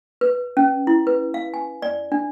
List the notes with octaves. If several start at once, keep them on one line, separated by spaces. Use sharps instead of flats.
B4
C#4
E4
B4
F5
G#5
D5
D4